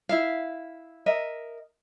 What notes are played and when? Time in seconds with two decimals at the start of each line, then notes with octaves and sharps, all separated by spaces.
0.09 E4 E5 F5
1.06 A#4 D#5 E5